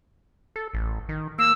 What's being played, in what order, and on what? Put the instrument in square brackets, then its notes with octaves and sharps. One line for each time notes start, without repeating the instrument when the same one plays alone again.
[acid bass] A4
A1
D#3
[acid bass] A#3 [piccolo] E6